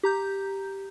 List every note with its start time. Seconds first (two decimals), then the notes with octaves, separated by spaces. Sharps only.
0.03 G4 A#5 G6